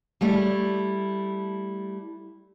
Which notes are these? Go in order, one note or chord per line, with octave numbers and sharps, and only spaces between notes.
G3 A3 E4